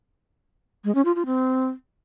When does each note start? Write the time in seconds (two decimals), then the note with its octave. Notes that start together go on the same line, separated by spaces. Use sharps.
0.84 G#3
0.95 C#4
1.05 F4
1.16 F4
1.26 C4